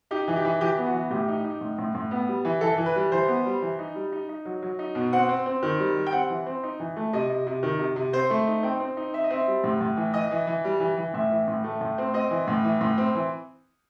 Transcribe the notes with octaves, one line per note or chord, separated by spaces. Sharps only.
D#4 G4
E3
G4
E3
E3 G4
B3
F#4
E3
A2 G4
D#4
D#4
A2
A2
A2
B3
G3
E3
E3 A4
E3
B4
G3
E3 C5
B3
G3
E3
D#4
G3
D#4
D#4
F#3
F#3
D#4
B2
C4 F#5
C4
C4
D#3
G3
G3
G5
C4 F#5
E3
C4
D#4
E3
A3
C3 D#5
C3
C3
D#3
C3
C3
C4 C5
A3
D#4
C4 G5
C4
D#4
C4 E5
D#5
C4 E5
G3
A2
A2
E3
E3 D#5
E3
E3
G3
E3
E3
A2 E5
E3
A2
A3
A2
C4
C4 D#5
E3
A2
E3
A2
C4
E3